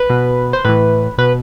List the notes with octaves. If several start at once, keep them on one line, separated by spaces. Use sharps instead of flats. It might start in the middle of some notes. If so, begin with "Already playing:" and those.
Already playing: B4
B2
C5
A2 E3 B4
B2 B4